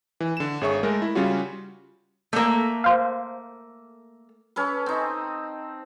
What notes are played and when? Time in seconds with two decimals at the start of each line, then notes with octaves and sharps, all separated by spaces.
0.20 E3
0.37 D3 E7
0.61 G#1 G#4 C#5 E5 C#6
0.83 G#3 A3 A4 A#4
1.02 E4
1.15 C#3 G3 C#4 F4 F#4
2.33 A3 A#3
2.84 C5 F5
4.56 C#4 A4 B4
4.86 C4 D#4